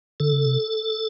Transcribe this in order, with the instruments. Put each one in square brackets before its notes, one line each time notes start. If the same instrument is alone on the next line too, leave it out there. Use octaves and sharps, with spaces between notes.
[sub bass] D3 [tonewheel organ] A4
[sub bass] C#3
C3